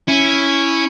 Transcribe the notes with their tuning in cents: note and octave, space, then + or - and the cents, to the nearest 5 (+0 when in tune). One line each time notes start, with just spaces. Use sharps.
C#4 +0 E4 +0